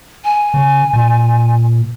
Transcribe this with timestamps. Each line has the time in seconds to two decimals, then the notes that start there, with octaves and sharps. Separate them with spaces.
0.24 G#5
0.54 C#3
0.93 A#2